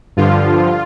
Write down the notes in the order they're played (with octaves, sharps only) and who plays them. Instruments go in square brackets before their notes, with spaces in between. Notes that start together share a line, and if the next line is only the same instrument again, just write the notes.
[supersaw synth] G2 D3 F3 F4